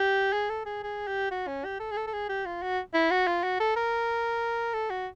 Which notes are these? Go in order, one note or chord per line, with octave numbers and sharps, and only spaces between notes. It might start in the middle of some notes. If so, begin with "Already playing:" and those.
Already playing: G4
G#4
A4
G#4
G#4
G4
F#4
C#4
G4
A4
G#4
A4
A4
G#4
G4
F4
F#4
E4
F#4
F4
F#4
A4
A#4
A4
F#4